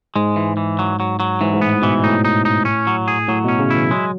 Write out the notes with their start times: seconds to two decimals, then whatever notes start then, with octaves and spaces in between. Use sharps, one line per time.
0.16 G#2 G#3
0.36 E3
0.57 E3
0.79 F#3
1.00 F#3
1.20 F#3
1.41 G#2 E3
1.53 G#2
1.61 A2 B3
1.82 B2 E3
2.03 A2 D#4
2.25 D#4
2.45 D#4
2.65 C#4
2.87 F#3
3.08 G#4
3.28 A2 F#3
3.44 B2 C#4
3.59 C#3
3.70 E3 E4
3.91 F#3 G#3